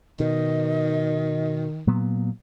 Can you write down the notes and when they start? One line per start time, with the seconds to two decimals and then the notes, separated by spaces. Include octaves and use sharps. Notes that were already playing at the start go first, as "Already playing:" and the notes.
0.20 B2 D#3 D#5
1.87 A#2 F#3 B3